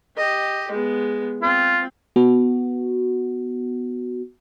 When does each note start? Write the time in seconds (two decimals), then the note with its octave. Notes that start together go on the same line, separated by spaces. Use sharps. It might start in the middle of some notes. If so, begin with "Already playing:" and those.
0.17 G4 D#5
0.71 G#3 B3
1.43 C4 F4
2.16 B3 F#4